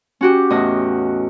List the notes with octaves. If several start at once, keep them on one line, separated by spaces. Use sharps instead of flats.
C#4 F#4 G4
E2 A2 D#5